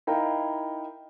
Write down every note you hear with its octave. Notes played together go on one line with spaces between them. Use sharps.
D#4 E4 A#4 F5 G5 A#5